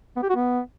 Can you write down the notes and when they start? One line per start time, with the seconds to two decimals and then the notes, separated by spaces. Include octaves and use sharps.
0.16 B3
0.23 G4
0.29 F#4
0.36 B3